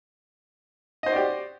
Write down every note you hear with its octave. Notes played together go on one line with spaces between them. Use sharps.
F#4 G4 C5 D5 D#5